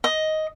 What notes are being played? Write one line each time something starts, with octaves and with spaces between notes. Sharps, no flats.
D#5